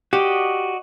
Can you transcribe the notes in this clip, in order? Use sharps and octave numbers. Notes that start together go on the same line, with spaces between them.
F#4 G4 D5 D#5